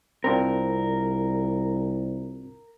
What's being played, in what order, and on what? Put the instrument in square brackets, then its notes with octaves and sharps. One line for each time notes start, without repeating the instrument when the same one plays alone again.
[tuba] C2 [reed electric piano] C4 D4 F4 [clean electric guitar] A#4